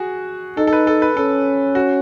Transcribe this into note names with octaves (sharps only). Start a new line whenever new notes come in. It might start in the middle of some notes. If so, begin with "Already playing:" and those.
Already playing: F#4 G#4
D#4 A4
A4
B4
A4
B4
C#4 A4
F#4